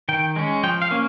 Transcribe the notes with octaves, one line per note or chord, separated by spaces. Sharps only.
D#3 G5
G#3 C#4
F3 G5
F5
A#3 C#4